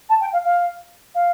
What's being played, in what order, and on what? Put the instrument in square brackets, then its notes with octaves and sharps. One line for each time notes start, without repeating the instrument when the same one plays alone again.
[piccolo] A5
G5
F5
F5
F5